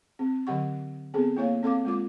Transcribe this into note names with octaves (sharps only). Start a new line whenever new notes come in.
C4
D3 F#3 G4 F#5 C#6
B3 C4 G#4 A4
A#3 E4 C#5 F5
C4 A4 F5 D6
G#3 F4 D6